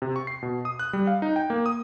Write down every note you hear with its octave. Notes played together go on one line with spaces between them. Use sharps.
C3
C#6
C7
B2
D#6
F#6
G3
F5
D#4
G5
A#3
D#6